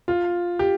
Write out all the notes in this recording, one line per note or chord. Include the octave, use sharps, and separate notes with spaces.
F4
G4